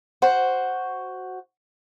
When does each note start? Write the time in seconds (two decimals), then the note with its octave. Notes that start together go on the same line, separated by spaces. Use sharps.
0.22 F#4 C5